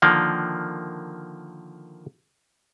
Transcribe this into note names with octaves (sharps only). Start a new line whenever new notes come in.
D3 D#3 F3 A#3 D4